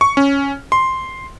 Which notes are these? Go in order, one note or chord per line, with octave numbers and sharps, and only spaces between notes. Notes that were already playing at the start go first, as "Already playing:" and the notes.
C#6
C#4
C6